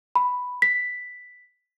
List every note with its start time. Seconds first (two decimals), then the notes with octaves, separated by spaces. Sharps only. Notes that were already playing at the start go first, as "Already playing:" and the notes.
0.15 B5
0.62 B6